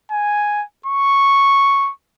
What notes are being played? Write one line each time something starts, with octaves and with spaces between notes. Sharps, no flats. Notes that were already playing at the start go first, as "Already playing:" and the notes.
G#5
C#6